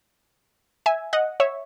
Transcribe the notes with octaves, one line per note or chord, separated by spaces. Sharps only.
E5 G#5
D#5 F#5
C#5 E5